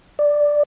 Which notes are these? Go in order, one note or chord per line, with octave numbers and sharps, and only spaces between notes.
D5